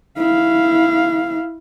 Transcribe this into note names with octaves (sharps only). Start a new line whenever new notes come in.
E4 F5